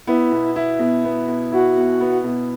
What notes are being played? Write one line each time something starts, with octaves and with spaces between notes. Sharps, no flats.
B3 E4
B2
E4
B2
B3
B2
E4 F#4
B2
B3
B2